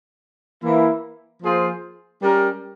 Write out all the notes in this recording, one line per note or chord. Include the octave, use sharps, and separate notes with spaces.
E3 A#3 E4
F3 A#3 F4 G#4 C5
G3 C#4 G4 A#4